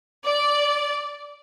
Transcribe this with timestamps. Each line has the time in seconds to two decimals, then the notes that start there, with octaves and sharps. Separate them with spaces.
0.25 D5